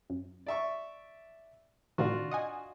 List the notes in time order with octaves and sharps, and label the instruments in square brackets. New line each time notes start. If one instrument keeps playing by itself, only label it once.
[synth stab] F#2
[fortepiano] D5 E5 C#6
[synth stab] A2 C3 D#3 [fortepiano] D4 F4 F#4
[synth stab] D#5 F#5 G#5